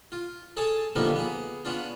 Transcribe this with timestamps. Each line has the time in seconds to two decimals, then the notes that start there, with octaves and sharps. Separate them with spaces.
0.12 F4
0.57 G#4 A4 C#5 G#5 A5
0.95 D3 D#3 F3 G3 A#3 B3
1.15 B3 G#4
1.65 B3 C#4 D4 F4